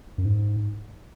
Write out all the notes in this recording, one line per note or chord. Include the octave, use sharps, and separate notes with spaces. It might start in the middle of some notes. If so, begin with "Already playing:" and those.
F#2
G#2